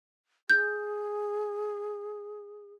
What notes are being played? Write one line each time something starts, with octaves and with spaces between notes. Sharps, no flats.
G#4 G6